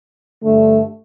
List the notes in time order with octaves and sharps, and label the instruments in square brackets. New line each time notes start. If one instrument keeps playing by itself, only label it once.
[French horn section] G2 D3 A3